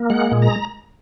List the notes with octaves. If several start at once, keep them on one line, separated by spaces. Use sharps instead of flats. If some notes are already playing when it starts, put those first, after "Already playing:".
Already playing: A#3
G#3 F#5
A#2
A#5